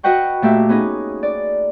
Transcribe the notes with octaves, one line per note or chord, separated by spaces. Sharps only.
F#4 B4 D#5 F#5 G5 C#6
A#2 A3 G4 E5
B3 C#4 D#4 G#4
D5